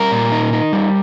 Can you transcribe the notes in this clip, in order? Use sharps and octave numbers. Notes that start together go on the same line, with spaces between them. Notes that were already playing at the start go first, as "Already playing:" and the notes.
Already playing: G3 A#4
A#2
D#4
D#4
G3